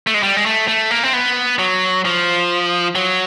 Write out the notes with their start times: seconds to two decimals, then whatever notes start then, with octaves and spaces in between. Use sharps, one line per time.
0.07 A3
0.14 G#3
0.23 G3
0.36 G#3
0.46 A3
0.68 A3
0.91 A#3
1.03 C4
1.13 B3
1.59 F#3
2.05 F3
2.95 F#3